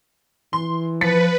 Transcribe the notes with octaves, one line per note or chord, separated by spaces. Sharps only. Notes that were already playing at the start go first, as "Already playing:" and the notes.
E3 C6
F3 B4 A6 B6 C#7